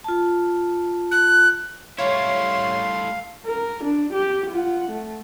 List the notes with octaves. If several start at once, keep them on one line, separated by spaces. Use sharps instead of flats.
F4 A5
F#6
G3 A3 E4 C#5 F5 C6
A#4
D4
G4
F4 F#5
A3